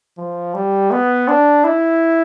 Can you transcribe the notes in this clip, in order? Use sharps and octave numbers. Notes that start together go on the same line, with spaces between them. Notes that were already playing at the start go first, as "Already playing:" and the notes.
F3
G3
B3
D4
E4